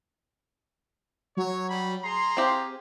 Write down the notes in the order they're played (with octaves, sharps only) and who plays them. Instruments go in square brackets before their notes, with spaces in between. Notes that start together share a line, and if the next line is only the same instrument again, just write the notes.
[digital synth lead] F#3 [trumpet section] C#5
[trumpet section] G3 B5
[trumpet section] G#4 A#5 [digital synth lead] C6
[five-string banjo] C4 G4 F5